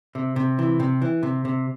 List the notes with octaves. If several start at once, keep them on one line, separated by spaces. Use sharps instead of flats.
C3
C3
E3
C3
E3
C3
C3